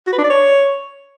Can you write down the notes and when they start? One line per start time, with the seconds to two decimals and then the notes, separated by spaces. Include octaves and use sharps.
0.07 F#4
0.13 B4
0.18 D4
0.24 D5
0.30 C#5